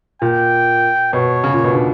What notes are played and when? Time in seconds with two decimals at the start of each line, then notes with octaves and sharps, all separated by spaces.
0.22 A#2 G5
1.13 B2 C#5
1.44 C#3
1.54 A#2
1.64 B2
1.74 D3